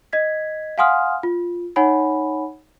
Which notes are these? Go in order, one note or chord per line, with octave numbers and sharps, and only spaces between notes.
D#5 G#6 B6
F5 F#5 G#5 C6 D#6 F6
F4
D#4 C#5 F#5 G#5 B5